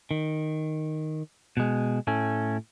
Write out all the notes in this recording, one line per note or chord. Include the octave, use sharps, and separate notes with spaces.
D#3
B2 G#3
A2 A3 C#4